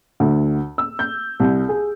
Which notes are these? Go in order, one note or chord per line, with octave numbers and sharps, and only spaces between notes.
D2
E6
G6
C2
G#4